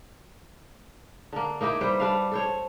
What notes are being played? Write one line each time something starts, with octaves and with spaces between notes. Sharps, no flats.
D3 A#3
A#3 D#4 E4 G4
G3 B4 C5
G3 D4 F5
A4 C5 C#5